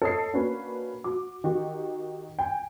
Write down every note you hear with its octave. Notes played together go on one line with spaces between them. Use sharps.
A4 C#5 D#5 D#6 C7
A#3 C#4 D4 F#4 B4
F#4 D6
D#3 F#4 G4
G5 G#5